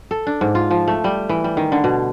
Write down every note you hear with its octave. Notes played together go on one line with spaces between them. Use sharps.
A4
D4
G#2
F4
F3
A3
G3
E3
G3
D#3
D3
B2